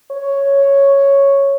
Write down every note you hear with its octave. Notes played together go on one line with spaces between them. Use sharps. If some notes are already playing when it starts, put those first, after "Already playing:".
C#5